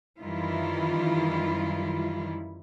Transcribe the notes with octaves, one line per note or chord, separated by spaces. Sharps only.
F#2 D#3 E3 G3 E4 F4